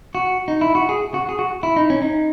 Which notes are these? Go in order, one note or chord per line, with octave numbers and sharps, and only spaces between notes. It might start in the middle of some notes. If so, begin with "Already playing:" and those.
F#4
D#4
E4
F#4
G#4
F#4
G#4
F#4
E4
D#4
C#4
D#4